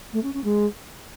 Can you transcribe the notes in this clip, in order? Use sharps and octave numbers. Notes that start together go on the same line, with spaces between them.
A3
C#4
C#4
G#3